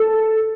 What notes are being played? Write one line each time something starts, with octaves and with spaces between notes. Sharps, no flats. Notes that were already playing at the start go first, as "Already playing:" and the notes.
Already playing: A4